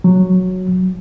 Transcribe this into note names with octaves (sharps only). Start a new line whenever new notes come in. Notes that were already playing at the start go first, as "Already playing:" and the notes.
F#3